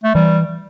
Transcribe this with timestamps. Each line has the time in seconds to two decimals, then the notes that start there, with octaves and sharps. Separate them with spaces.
0.04 A3
0.15 E3 G3